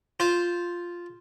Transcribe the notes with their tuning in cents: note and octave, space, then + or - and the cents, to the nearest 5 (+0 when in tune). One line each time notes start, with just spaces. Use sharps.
F4 +0 C5 +0